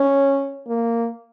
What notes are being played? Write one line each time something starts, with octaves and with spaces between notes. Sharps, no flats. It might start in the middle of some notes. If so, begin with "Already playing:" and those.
Already playing: C#4
A#3